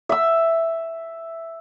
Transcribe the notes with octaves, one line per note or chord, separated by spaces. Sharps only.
E5 E6